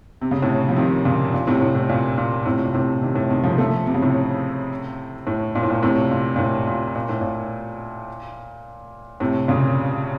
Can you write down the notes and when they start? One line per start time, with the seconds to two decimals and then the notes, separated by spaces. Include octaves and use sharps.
0.21 C3
0.31 C#3
0.42 A2 C3
0.69 F3
0.76 C3 D#3
1.05 A#2 C#3
1.34 A#2
1.47 A2 C3
1.61 A2
1.75 A2
1.89 A#2
2.18 A#2
2.46 A2 C3
2.65 A#2
2.74 A2 C3
3.01 C3 D#3
3.15 A2
3.30 C3 D#3
3.43 C#3 F3
3.58 F3 A3
3.86 C3
3.94 C#3
4.02 A2 C3
5.27 A2
5.55 A#2
5.63 A2
5.70 A#2
5.83 A2 C3
6.11 A#2
6.36 A#2
6.39 A2
6.67 A#2
6.95 A#2
7.09 A2
7.21 A#2
9.20 A2 C3
9.48 A#2 C#3